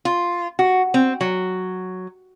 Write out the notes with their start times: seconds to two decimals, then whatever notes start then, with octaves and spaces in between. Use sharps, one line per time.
0.05 F4
0.59 F#4
0.94 C4
1.21 F#3